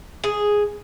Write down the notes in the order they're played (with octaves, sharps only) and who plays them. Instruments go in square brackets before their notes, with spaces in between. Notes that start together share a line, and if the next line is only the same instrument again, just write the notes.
[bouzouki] G#4